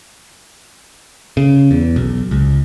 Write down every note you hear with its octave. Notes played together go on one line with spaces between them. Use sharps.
C#3
E2
B1
C#2